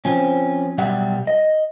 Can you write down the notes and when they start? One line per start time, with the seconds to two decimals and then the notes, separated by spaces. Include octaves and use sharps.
0.05 F3 C4 C#4
0.78 B1 G3 E5 F#5
1.27 D#5